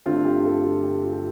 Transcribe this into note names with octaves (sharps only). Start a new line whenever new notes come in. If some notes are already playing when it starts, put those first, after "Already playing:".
G1 G2 D3 A3 C4 F4
G4
A4
F4
G4
F4
G4